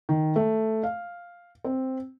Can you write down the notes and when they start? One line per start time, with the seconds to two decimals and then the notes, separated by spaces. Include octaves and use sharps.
0.09 D#3
0.36 A3
0.83 F5
1.65 C4